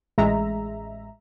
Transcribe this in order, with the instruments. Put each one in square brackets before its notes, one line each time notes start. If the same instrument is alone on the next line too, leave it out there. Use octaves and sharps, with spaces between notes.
[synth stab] A1 G#3 E5 A#5